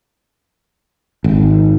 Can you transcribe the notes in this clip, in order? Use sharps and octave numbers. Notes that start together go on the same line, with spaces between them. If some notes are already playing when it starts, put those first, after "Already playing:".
G#1